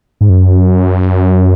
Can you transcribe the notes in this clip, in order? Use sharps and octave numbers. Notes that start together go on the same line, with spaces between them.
G#2
F#2